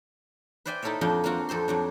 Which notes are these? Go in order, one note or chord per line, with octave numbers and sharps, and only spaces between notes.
B4 C5 D5 E5 G5 G#5
D#4 E4 A4 A#4 C#5 E5
F2 F3 D4 A#4 G5
A#3 C4 D4 F4 F#4
F2 A4 C5 C6
F2 F#3 D4